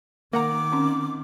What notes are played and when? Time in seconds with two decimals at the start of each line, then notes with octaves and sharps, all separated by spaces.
0.33 D#3 A#3 F#5 A#5 D6
0.72 C4 C#4 C6